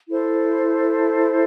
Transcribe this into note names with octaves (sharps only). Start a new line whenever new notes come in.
E4 A4 C5